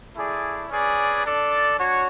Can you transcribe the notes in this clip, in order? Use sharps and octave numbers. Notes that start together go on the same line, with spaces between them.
A3 E4 G#4 D5
C#4 G#4 B4 D5
D4 A4 D5
D4 F#4 C#5